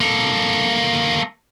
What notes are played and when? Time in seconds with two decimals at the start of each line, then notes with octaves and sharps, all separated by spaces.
0.01 A#3 A4